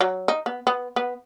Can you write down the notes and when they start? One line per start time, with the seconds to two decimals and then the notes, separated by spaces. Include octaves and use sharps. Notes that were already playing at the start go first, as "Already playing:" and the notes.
0.01 F#3
0.28 D#4
0.46 B3
0.67 B3
0.96 B3